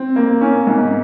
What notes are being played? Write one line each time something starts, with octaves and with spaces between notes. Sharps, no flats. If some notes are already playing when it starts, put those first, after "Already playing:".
Already playing: C4
A#3
C#4
G#2